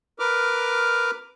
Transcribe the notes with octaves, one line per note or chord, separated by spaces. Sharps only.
A#4 B4 D6 F6